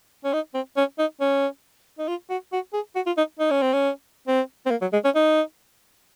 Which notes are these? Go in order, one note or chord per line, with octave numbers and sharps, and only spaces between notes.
C#4
D#4
C4
C#4
D#4
C#4
D#4
F4
F#4
F#4
G#4
F#4
F4
D#4
D#4
C#4
C4
C#4
C4
C4
A#3
F#3
G#3
C#4
D#4